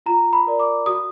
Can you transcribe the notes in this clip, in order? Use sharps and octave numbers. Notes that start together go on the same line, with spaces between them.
F4 A#5
B5
A#4 D5
D6
F#4 D#6